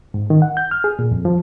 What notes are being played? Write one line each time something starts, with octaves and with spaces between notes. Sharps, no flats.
G#2
D#3
F#5
G6
F6
G#4
A#2
F2
F3